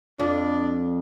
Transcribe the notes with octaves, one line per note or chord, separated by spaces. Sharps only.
F2 D4